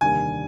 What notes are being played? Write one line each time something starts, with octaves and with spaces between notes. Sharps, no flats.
F1 D#2 D3 G3 A#3 G#5